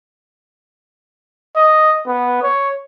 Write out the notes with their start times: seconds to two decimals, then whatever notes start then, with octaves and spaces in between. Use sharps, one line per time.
1.56 D#5
2.07 B3
2.43 C#5